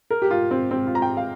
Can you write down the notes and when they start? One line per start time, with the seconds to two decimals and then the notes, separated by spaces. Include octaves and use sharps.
0.11 A#4
0.22 G4
0.31 F4
0.51 C4
0.71 C4
0.87 F4
0.95 A#5
1.02 G5
1.17 F5